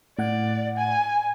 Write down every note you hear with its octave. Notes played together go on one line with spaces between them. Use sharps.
A2 D5 F#5
G#5